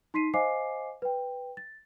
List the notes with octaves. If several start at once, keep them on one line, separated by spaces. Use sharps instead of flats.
D#4 C6 B6 C7 D#7
C5 D#5 F5 G#5 D6 C7
B4 G5
A6